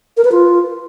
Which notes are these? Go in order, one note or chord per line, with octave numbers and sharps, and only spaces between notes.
A#4
B4
F4